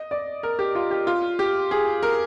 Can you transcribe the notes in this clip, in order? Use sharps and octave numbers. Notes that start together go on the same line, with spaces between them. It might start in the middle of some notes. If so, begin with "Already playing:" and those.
Already playing: D#5
D5
A#4
G4
F4
G4
F4
G4
G#4
A#4